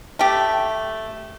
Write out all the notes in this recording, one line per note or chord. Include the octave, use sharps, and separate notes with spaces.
A3 G4